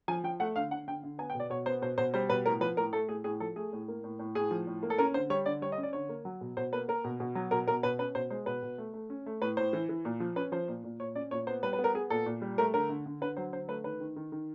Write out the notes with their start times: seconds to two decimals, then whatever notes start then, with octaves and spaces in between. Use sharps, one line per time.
0.08 F3 G#5
0.24 F3 G5
0.40 A3 F#5
0.56 D3 F5
0.71 D3 F#5
0.88 D3 G5
1.03 D3
1.19 B3 G#5
1.30 G5
1.35 B2
1.40 D5
1.50 B2 C#5
1.66 B3 C5
1.82 B2 C5
1.98 B2 C5
2.14 G3 C5
2.30 B2 B4
2.46 A2 A#4
2.61 F3 B4
2.77 A2 A#4
2.93 A3 A4
3.09 A2 G#4
3.24 A2 G#4
3.40 F3 A4
3.56 A3 G#4
3.73 A2
3.88 A#3
4.04 A2
4.19 A2
4.35 A2 G#4
4.51 F3
4.67 A2
4.83 A#3
4.90 A4
4.98 C#4 A#4
5.14 D3 C5
5.30 G3 C#5
5.46 D3 D5
5.62 G3 C#5
5.72 D#5
5.78 C#4
5.83 D5
5.93 D3 C#5
6.09 A#3
6.25 F#3
6.41 B2
6.57 B2 C5
6.73 A#3 B4
6.88 A#3 A#4
7.04 B2
7.20 B2
7.35 F#3
7.51 B2 A#4
7.67 B2 A#4
7.83 B2 B4
7.99 C#4 B4
8.15 B2 C5
8.30 G#3 C5
8.46 B2 B4
8.62 B2
8.78 A3
8.94 A3
9.10 C#4
9.26 A3
9.42 A2 B4
9.57 A2 C5
9.73 E3
9.89 E3
10.05 A#2
10.20 F3
10.36 C#4 B4
10.52 F3 C5
10.68 A#2
10.84 A#2
10.99 A#2 C#5
11.15 C#4 D5
11.31 A#2 C#5
11.47 B3 C5
11.63 G3 B4
11.73 B4
11.79 B3
11.84 A#4
11.94 B3 G#4
12.10 A#2 A4
12.26 A#2
12.42 G3
12.58 A3 A#4
12.74 D3 A#4
12.90 D3
13.06 D3
13.21 D3 B4
13.37 F#3 C5
13.53 D3 C5
13.68 A3 B4
13.84 D#3 B4
14.00 D#3
14.16 D#3
14.32 D#3